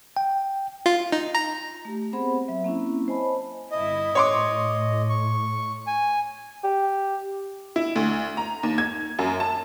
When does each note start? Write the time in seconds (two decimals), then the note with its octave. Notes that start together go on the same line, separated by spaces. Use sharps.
0.17 G5
0.86 F4
1.12 D#4
1.35 A#5
1.85 A3 G4
2.13 B3 C4 G#4 C5 F#5 B5
2.48 F#3 E5
2.64 A#3 C4 C#4 E4
3.08 C5 C#5 D#5 G#5 A5 B5
3.71 G1 E4 D#5
4.15 A2 C#5 C6 D6
5.09 C#6
5.87 G#5
6.64 G4
7.76 E4
7.96 D2
8.37 A#5
8.63 D#2
8.78 G#6
9.19 F#2
9.40 A5